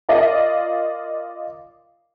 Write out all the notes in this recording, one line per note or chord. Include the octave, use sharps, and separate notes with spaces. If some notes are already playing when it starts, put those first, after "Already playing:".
F4 A#4 D5 D#5 F5